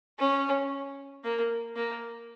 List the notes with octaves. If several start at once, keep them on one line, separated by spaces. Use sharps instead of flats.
C#4
A#3
A#3